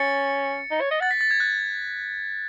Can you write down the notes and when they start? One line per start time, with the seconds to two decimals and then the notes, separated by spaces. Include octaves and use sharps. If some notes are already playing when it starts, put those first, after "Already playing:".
Already playing: C#4 A6 C#7
0.71 D#4
0.81 C#5
0.91 D#5
1.01 F#5 A6
1.11 B6
1.21 A6
1.31 G#6
1.40 F#6